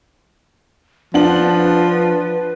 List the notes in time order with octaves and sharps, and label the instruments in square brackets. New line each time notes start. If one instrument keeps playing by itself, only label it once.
[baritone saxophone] F3 [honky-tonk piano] D4 F#5 F#7 [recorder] B4